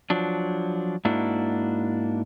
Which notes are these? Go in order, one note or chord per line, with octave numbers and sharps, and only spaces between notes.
F3 F#3 D4
G#2 A#3 D4 E4 F#4